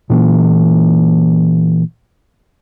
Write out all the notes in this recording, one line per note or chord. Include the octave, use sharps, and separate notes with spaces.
A#2 E3 A#3